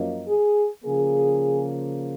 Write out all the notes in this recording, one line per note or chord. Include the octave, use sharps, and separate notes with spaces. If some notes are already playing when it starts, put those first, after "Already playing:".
Already playing: F#2 F3 A#3 D#4
G#4
C#3 F3 A#3 G#4